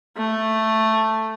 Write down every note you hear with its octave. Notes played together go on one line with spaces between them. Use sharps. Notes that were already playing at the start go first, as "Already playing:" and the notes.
A3